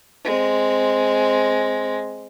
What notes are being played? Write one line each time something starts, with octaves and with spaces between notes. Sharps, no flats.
G#3 C4